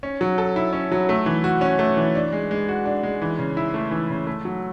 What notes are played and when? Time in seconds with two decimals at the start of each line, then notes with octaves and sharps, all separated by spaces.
0.03 C#4
0.21 F#3
0.38 A4
0.56 E4
0.73 C#4
0.92 F#3
1.09 A3
1.26 E3
1.44 F#4
1.61 C#4
1.79 A3
1.97 E3
2.15 D4
2.32 G#3
2.51 G#3
2.69 F#4
2.85 D4
3.03 G#3
3.22 E3
3.39 C#3
3.57 E4
3.74 A3
3.91 E3
4.10 C#3
4.27 A3
4.45 F#3